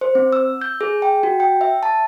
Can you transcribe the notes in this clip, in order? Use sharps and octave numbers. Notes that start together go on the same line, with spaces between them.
C5
C4
E6
G6
G#4
G5
F#4
G5
E5
A5